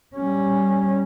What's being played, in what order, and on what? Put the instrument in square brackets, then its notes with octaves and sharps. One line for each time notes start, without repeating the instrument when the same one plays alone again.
[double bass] G3 C#4